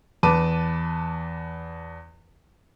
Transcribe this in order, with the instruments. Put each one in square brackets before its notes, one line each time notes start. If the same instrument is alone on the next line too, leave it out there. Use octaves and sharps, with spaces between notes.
[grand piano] E2 B4 A5 D6 D#7